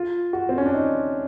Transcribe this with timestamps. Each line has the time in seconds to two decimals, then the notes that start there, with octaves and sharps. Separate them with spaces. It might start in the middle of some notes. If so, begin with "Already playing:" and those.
Already playing: F4
0.33 F#4
0.49 C4
0.58 C#4
0.66 D4
0.74 D#4